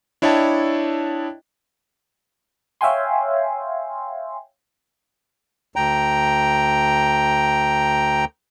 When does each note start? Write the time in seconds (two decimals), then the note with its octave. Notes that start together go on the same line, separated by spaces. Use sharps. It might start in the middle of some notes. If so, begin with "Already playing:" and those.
0.22 D4 E4 C#5 D#5 G5 A5
2.81 C#5 E5 F5 G5 G#5 C6
5.76 D2 G5 A#5